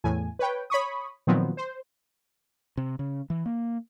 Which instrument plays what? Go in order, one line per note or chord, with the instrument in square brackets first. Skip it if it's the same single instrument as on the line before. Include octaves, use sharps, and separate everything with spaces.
[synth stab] E2 A2 G#5
B4 C#5 G5
C#5 B5 C#6 D#6
A#2 D#3 F3 F#3 B3 C4
C5
[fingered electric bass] C3
C#3
E3
A#3